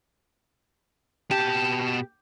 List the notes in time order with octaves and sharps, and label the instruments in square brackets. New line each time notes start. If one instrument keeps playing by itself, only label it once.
[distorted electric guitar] B2 A5 [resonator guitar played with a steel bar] G4